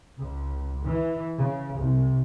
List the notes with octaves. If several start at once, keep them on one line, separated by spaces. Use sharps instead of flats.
C#2
E3
C#3
C2